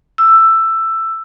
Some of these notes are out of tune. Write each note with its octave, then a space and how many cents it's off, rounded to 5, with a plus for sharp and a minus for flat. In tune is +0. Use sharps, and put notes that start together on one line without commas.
E6 +10